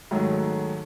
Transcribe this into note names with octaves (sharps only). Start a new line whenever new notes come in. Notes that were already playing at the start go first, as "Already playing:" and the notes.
G#2 D#3 F#3 A3